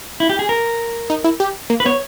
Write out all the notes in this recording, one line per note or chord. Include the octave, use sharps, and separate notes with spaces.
E4
G4
G#4
A#4
D#4
E4
G4
A#3
B4
B3 C#5